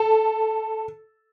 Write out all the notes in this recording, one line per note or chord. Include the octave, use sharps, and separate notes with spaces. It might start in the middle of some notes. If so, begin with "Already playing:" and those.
Already playing: A4